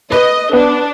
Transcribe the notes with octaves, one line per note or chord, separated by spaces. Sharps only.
B4 D#5
B3 D4